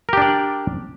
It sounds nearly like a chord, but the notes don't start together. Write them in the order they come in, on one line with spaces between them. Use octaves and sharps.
A#4 G4 D4 D5